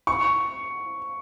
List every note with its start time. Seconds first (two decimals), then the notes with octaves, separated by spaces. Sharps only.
0.07 C#6